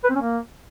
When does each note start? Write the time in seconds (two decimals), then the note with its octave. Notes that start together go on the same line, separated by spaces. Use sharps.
0.04 B4
0.10 C4
0.15 C#4
0.21 A#3